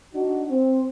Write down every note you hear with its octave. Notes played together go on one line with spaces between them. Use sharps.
D4 D#4 F#4
C4